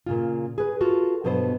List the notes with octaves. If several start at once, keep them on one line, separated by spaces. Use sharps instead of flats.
A#2 C#3 F4
G#4 B4
F4 F#4 A4
G2 B2 F#3 B3 A4 C5